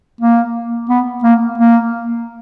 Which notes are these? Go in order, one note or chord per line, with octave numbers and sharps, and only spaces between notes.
A#3
B3
A#3
A#3